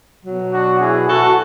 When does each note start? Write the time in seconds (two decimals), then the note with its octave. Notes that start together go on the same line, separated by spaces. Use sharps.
0.24 B2 F#3
0.52 D4 F#4
0.81 E4 G#4
1.09 F#4 A4